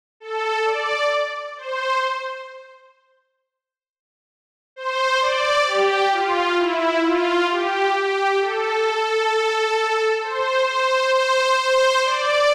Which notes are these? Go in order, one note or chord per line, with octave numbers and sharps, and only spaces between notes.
A4
D5
C5
C5
D5
G4
F4
E4
F4
G4
G4
A4
C5
C5
C5
C5
D5